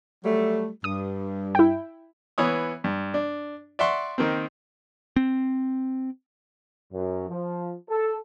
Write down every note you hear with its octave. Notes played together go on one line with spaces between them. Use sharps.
F#3 G3 A3
G2 D#6
E4 G5
E3 B3 C#5 D#6
G2
D4
D5 E5 F#5 C6 C#6
D#3 A#3 C4
C4
F#2
F3
A4